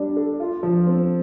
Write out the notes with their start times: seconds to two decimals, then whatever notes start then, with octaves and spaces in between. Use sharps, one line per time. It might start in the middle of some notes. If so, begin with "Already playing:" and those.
Already playing: G3 D4
0.16 A4
0.40 F4
0.63 F3
0.86 C4